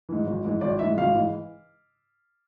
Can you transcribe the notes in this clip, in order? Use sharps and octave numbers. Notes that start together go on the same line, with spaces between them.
G#2 E3
G#1
G#2 E3
G#1 D5
G#2 E3 E5
G#1 F5
G#2 E3